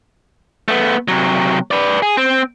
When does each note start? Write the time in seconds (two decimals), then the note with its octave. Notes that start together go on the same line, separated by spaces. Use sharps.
0.68 A3 B3
1.08 C3 F#3
1.71 B4 D5
2.02 G#4
2.17 C4